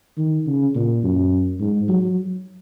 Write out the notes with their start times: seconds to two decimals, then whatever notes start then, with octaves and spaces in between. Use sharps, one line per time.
0.18 D#3
0.46 C#3
0.75 A#2
1.04 F#2
1.60 G#2
1.89 F#3